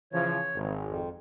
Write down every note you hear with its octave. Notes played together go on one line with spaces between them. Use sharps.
C#3 E3 F3 C#5
G#1
F2